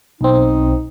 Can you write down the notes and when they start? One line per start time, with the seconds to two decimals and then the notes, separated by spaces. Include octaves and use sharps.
0.21 B1 C4 D#4